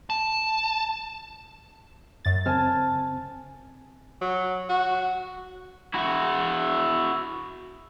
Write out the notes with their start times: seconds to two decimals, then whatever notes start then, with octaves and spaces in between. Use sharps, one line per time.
0.10 A5
2.25 F#2 A6
2.46 C#3 C4 G#5 A5 F6
4.21 F#3
4.69 F#4
5.94 E4 F#4